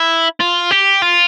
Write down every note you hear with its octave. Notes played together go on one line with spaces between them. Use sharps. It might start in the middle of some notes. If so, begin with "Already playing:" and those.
Already playing: E4
F4
G4
F4